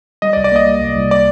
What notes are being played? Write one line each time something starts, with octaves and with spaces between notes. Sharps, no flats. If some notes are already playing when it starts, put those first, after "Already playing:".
G3 D#5
D5
C2
D5
A#3 D#5
G3
C2
C2
D5